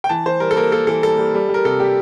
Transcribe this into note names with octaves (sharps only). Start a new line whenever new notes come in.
G5
E3 A5
E3 C5
G3 A#4
A4
A#3 A#4
A#3 A4
E3 A4
G3 A4
G3
G3
G3
A#4
C3 A4
G3 G4